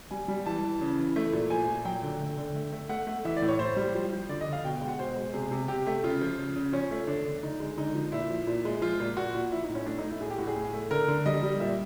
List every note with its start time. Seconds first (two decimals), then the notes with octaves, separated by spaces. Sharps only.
0.11 G3 G#5
0.28 G3
0.46 E3 A5
0.63 E3
0.81 C#3
0.99 E3
1.16 A3
1.33 A#2
1.50 F3 G#5
1.68 A#2
1.85 F#3 G5
2.03 D3
2.20 A3
2.37 D3
2.55 A3
2.72 A3
2.89 A3 F#5
3.07 A3
3.25 E3 E5
3.37 D5
3.42 A2
3.48 C#5
3.59 A2 C5
3.77 G3
3.94 F3
4.12 F3
4.29 D3 D5
4.41 D#5
4.47 D3
4.53 F5
4.64 B2 G5
4.76 G5
4.81 G#3
4.88 F#5
4.99 B2 C5
5.16 G#3
5.33 C3 G#4
5.51 C3
5.68 C3 G4
5.87 A3
6.04 C#3 F4
6.21 F3
6.38 C#3
6.56 C#3
6.72 F3 C#4
6.91 A3
7.07 D3 D4
7.25 D3
7.43 D3 D#4
7.60 G#3
7.77 D3 D#4
7.94 F3
8.12 A#2 E4
8.30 F3
8.47 A#2
8.65 G#3
8.82 F3 F4
9.00 A#2
9.17 A#2 F#4
9.35 A#2
9.52 F3 E4
9.64 D#4
9.69 A2
9.75 C#4
9.86 A3 D4
9.98 D#4
10.04 A3
10.10 E4
10.21 A2 G#4
10.30 G4
10.38 A2 F#4
10.47 G#4
10.56 A2
10.73 A3
10.91 D3 A#4
11.08 D3
11.26 G3 D#5
11.43 G3
11.60 A#2 E5